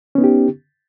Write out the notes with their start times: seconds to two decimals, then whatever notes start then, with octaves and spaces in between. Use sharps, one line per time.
0.15 C#4
0.18 B3
0.21 D#4
0.24 G4